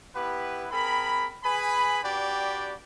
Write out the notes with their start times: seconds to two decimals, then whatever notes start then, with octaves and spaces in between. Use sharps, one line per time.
0.16 B3 E4 G4 B4
0.71 C4 G#4 A#4 B5
1.44 G#4 B4 G#5 B5
2.03 D4 F#4 G4 B4 D5 G5